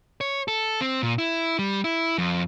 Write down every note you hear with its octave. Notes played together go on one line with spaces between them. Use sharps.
C#5
A4
C4
A#2
E4
G3
E4
F2